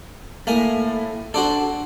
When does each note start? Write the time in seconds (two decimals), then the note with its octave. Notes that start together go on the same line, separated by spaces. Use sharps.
0.47 A2 A3 A#3 G#5
1.34 D4 F#4 A4 C5 D5